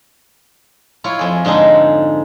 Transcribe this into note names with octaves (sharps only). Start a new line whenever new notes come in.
E4 F4 C#5
F2 G#4
G#2 D3 G#3 D#4 A4